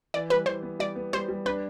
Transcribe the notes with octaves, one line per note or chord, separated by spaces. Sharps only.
E3 D5
G3 B4
E3 C5
B3
G3 D5
B3
G3 C5
G3
D4 B4